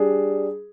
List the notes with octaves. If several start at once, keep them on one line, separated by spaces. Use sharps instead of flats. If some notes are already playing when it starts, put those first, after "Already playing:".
Already playing: G3 D4 G#4